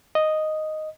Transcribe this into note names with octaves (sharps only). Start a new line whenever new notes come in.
D#5